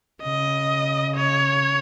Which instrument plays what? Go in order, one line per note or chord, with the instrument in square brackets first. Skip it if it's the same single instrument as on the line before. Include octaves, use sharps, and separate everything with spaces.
[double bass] C#3 [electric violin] D#5
[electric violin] C#5